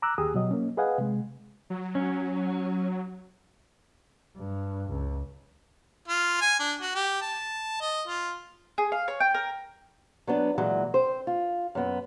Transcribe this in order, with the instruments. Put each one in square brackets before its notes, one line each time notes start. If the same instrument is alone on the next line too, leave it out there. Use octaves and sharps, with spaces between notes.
[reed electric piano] A#5 D6 E6 F#6
D#2 G4 G#4 G#5 D#6
B2 F#3 D#5
A#3 C#4
G#4 B4 D#5 F5 F#5 G#5
C3 G#3
[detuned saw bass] F#3
[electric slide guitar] C#4
[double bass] G2
C#2
[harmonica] F4
G#5
D4
F#4
G4
A5
D#5
F4
[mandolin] G#4
F5
C#5
G5
A#4
[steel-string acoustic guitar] F#3 B3 D4
A#2 E3 F#3 G#3
C4 C5
F4
F#2 B3